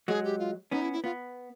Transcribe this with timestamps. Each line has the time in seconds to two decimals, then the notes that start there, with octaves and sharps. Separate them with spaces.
0.08 F#3 G#3 G#4
0.24 G4
0.39 F4
0.71 B3 C#4 D#4
0.82 E4
0.93 E4
1.04 B3 F4